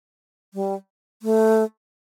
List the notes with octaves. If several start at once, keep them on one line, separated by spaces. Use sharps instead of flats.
G3
A3